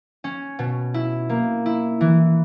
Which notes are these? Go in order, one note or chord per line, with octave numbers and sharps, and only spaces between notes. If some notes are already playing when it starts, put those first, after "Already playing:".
C#4
B2
E4
A#3
E4
E3